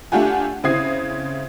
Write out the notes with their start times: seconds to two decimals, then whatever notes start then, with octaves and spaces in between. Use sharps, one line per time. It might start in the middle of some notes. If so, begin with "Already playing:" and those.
0.12 A3 D4 F4 G4 F#5 G#5
0.64 C#3 C4 E4 D#6 G#6 C7